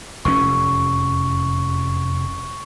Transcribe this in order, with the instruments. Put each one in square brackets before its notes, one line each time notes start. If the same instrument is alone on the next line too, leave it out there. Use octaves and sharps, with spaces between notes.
[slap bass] F1 E2 C#4 [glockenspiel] C#6